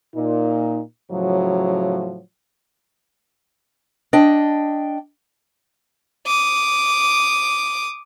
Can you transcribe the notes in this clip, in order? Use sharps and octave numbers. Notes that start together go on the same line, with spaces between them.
A#2 D#4
A2 C#3 F3 F#3
D4 D#5 G5
D6 D#6